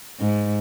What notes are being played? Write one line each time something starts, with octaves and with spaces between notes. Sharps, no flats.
G#2